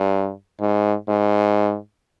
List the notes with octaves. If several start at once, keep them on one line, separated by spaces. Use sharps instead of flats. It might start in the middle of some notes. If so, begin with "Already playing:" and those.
Already playing: G2
G#2
G#2